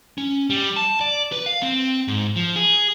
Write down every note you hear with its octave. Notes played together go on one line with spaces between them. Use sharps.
C#4
G3
A5
D5
B4
F5
C4
G#2
F3
G#4